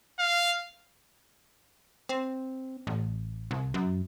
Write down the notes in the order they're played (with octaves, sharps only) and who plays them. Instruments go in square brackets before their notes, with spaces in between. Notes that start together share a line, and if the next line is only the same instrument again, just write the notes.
[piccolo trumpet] F5
[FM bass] C4
A1
C2
F#2